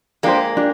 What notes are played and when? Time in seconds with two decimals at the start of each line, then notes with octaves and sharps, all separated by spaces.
0.23 G#3 A#3 D4 G4 C5
0.57 D4 G4